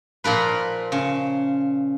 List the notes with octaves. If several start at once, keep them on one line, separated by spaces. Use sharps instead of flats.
A#2 F3 A#4 B4
C#3